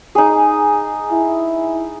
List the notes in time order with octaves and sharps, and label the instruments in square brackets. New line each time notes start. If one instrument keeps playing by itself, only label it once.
[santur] D#4 G#4
[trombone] E4